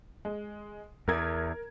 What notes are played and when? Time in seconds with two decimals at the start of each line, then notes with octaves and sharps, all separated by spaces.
0.25 G#3
1.08 E2 A#4 A#5 G#6